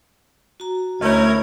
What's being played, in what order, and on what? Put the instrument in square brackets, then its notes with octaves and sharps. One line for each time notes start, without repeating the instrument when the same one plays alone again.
[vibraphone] F#4 A#5
[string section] D2 G#6 [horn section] C#4 E4 A#4 [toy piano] C#5 D#5